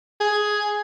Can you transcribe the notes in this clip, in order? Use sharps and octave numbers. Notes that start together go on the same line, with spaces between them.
G#4